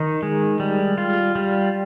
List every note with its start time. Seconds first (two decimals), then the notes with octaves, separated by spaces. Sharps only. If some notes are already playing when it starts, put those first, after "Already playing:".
Already playing: D#3 D#4
0.23 G#3
0.60 G3
0.98 F4
1.35 G3